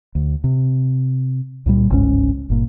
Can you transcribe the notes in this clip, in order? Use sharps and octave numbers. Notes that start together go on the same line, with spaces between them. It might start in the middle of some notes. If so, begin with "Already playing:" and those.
D2
C3
C#2 A#2 G3
G1 C#2 G#2 C#4
G1 A#2